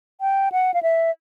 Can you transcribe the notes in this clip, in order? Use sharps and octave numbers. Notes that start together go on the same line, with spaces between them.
G5
F#5
F5
E5